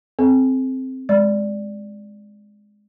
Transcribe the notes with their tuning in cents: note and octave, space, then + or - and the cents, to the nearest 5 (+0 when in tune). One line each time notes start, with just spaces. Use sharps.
C4 +0 A4 -40
G#3 +0 D5 +0